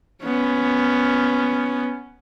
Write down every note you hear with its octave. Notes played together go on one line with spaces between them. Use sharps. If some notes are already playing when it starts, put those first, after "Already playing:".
B3 C#4